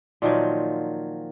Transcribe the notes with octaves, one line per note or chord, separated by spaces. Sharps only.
A#2 D#3 F3 F#3